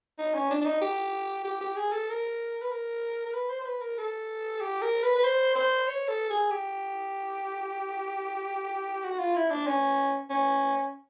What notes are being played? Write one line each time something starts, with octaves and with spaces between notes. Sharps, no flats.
D#4
C#4
D4
D4
D#4
G4
G4
G4
G#4
A4
A#4
B4
A#4
A#4
B4
C5
C5
B4
A#4
A4
G4
A#4
B4
B4
C5
C5
C#5
A4
G#4
G4
F#4
F4
E4
D4
C#4
C#4